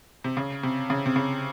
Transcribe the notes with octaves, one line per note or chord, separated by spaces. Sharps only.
C3
C#3
C3
C#3
C3
C#3